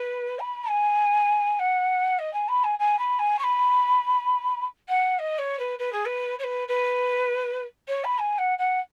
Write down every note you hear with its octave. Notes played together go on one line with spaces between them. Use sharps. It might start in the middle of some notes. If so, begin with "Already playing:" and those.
Already playing: B4
B5
G#5
F#5
D#5
G#5
B5
G#5
G#5
B5
G#5
C#6
B5
F#5
D#5
C#5
B4
B4
G#4
B4
C#5
B4
B4
C#5
B5
G#5
F#5
F#5